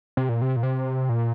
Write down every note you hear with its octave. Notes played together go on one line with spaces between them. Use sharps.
C3
A#2
C3
A#2
C3
A#2